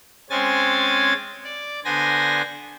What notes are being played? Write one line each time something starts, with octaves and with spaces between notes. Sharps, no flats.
G#3 C4 C#4 G#5 A6
D5
D3 B3 C5 G#5 A#6